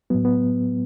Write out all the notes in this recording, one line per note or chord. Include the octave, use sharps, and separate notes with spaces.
A2 F#3 B3
B3